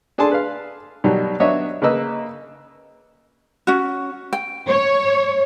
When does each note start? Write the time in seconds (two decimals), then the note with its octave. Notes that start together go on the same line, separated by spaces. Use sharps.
0.18 D4 G#4 A4 G#5 A5 C6
0.31 B4 F5
1.04 B2 D#3 F#3 G3
1.40 F#3 B3 D4 C#5 D#5 E5
1.82 C#3 A#3 B4 D#5 E6
3.67 C#4 F#4
4.33 G5
4.70 C#5